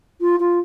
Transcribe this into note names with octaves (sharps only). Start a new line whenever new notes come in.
F4
F4